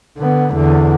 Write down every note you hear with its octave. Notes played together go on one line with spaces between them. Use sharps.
D3 B3
E2 D3